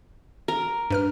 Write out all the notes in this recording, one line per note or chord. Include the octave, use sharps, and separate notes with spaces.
A#4
G2 B4 F6